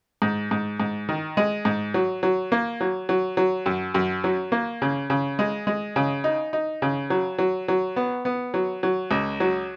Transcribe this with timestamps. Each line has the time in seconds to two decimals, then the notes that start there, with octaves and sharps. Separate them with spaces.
0.22 G#2
0.51 G#2
0.80 G#2
1.09 D#3
1.37 G#3
1.65 G#2
1.94 F#3
2.23 F#3
2.52 A#3
2.81 F#3
3.09 F#3
3.37 F#3
3.66 F#2
3.94 F#2
4.24 F#3
4.52 A#3
4.82 C#3
5.10 C#3
5.39 G#3
5.67 G#3
5.96 C#3
6.24 D#4
6.53 D#4
6.82 C#3
7.10 F#3
7.39 F#3
7.68 F#3
7.96 B3
8.25 B3
8.54 F#3
8.83 F#3
9.11 C#2
9.40 F#3